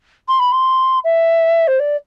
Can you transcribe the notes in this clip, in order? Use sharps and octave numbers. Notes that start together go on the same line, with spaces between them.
C6
B5
C6
E5
C5
D5